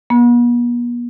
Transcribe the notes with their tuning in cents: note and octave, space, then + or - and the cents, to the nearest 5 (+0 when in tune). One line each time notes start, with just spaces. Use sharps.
B3 -45